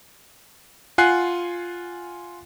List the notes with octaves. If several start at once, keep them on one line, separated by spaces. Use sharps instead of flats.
F4 F#5 G#5 F#6 C7